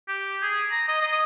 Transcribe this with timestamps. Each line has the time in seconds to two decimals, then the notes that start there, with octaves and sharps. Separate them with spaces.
0.08 G4
0.42 G#4
0.71 A#5
0.88 D#5
1.02 D#5